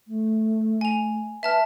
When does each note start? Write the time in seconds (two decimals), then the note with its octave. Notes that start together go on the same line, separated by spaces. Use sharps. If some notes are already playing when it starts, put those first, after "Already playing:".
0.07 A3
0.81 G#5 F7
1.43 B4 E5 A5 F6